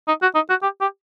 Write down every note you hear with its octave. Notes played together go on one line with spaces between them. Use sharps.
D#4
F#4
D#4
F#4
G4
G4